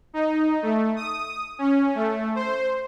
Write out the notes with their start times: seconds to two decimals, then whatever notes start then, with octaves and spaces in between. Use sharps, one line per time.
0.14 D#4
0.62 A3
0.96 D#6
1.59 C#4
1.95 A3
2.35 C5